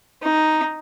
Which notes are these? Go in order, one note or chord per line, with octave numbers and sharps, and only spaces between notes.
D#4